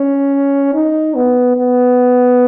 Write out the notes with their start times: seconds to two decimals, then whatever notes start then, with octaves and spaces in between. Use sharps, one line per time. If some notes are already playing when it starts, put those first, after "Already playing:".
Already playing: C#4
0.74 D#4
1.15 B3
1.57 B3